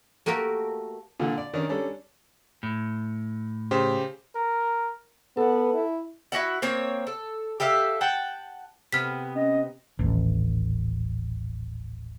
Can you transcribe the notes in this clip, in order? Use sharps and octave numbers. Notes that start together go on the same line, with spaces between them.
A3 A#3 F#4 G4 A4 A#4
A#2 D3
D5
D#3 C#4 D4
G3 C#4 D4 A4
A2
C#3 G4 C5
A#4
B3 A4 F#5
E4
E4 F#4 G4 F#5
A#3 C4 C#5
A4
G4 A4 E5 F5
F#5 G5 A5
C3 B3 F6 B6
C#4 D#5
D#1 A1